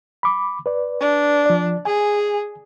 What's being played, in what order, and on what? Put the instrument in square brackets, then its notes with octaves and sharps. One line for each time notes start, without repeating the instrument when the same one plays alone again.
[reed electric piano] B5 D6
B4 D5
[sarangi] D4
[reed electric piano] F3 D5
[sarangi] G#4 [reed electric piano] G#5